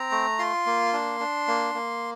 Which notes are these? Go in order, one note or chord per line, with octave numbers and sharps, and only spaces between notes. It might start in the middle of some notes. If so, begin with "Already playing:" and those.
Already playing: C4 A#5
A3
F4 C6
A#3
D4
D4
A#3
A#3